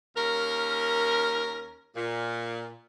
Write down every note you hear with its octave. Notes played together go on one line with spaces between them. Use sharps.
D#2 C#4 A#4
A#2